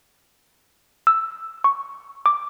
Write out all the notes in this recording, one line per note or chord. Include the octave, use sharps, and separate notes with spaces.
E6
C#6
D6